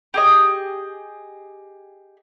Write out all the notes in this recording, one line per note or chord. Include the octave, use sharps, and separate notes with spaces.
G4 G#4 D#5